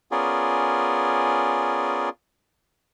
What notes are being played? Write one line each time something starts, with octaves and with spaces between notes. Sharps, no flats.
B3 C#4 F4 G#4 A#4 D5